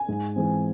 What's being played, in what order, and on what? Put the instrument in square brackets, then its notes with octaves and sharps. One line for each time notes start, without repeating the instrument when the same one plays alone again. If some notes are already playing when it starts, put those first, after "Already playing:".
Already playing: [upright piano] G#5
G#2
E3 G#3 C4